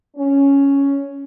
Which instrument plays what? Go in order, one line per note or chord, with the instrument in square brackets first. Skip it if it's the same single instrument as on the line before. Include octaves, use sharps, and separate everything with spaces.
[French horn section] C#4